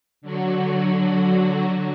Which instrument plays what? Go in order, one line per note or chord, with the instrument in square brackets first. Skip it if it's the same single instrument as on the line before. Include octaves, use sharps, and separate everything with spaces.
[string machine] D3 F#3 F#4